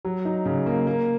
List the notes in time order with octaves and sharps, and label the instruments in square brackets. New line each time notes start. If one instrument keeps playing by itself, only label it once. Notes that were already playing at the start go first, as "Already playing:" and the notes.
[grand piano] F#3
D#4
C#3
A#3
A#3